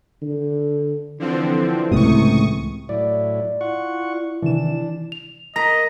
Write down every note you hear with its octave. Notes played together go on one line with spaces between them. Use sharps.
D3
D3 E3 F3 C4
C#2 A2 C3 C#6 D#6
A2 F#3 E4 D5
E4 F4 F#5 C#6
C3 D#3 E3 D4 E7
F7
A#4 D#5 A#5 A#6 B6